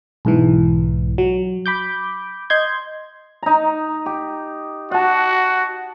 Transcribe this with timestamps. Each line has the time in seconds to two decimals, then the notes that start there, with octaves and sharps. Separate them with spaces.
0.25 B1 G#2 E3
1.18 F#3
1.66 B5 D6 G6
2.50 D#5 C6 G6 G#6
3.43 D#4 A#5
4.06 G4
4.91 F#4 F#5 A5